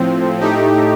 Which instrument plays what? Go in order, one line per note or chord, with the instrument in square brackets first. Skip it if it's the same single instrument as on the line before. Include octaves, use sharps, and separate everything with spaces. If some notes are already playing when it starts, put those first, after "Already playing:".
Already playing: [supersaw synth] A2 F3 C4
A2 A3 D#4 G4